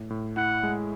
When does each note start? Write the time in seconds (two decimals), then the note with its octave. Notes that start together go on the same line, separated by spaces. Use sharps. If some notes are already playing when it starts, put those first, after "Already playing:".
Already playing: A2
0.10 A2
0.37 E4 F#5
0.63 G#3